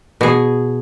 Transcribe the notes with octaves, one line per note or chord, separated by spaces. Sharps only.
B2 G#4